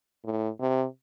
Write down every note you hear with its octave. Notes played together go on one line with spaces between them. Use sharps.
A2
C3